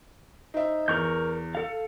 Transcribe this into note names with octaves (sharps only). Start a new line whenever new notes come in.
D#4 C5 E5
E2 A#4 C#6 G6
A4 F5